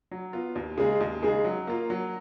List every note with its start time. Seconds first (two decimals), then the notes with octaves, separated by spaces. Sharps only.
0.11 F#3
0.33 B3 F4
0.55 D#2
0.78 C#3 G#3 D#4 G#4
1.00 D#2
1.23 C#3 G#3 D#4 G#4
1.45 F#3
1.67 A#3 F4
1.90 F#3